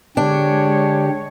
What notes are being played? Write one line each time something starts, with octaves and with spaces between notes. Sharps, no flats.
D3 G#3 D4 G4 C#5